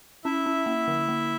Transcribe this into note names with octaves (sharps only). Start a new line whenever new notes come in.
C#4 E4 E5
C#4
A#3
D3
A#3